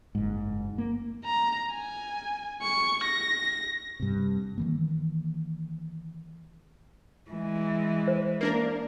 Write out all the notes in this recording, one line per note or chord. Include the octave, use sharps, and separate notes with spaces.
F#1 G#2
A#3
A#5
G#5
C#6
A#6
G2 C3
D#3 E3 A#3
E3 G#3
C5
A#3 D4 A#4